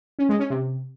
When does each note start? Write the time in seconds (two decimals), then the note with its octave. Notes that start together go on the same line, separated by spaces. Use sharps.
0.19 C#4
0.29 G#3
0.39 C#4
0.50 C3